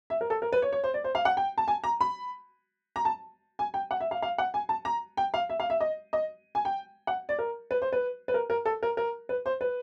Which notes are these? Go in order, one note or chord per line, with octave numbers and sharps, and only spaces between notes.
E5
A#4
A4
A#4
B4
C#5
C#5
C5
D5
C5
F5
F#5
G5
A5
G#5
A#5
B5
A#5
A5
G#5
G5
F#5
E5
F5
F5
F#5
G#5
A5
A#5
G5
F5
E5
F5
E5
D#5
D#5
G#5
G5
F#5
D5
A#4
B4
C5
B4
B4
A#4
A#4
A4
A#4
A#4
B4
C5
B4